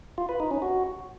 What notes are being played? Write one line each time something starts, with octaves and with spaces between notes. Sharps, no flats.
F4
B4
D#4
C#4
F#4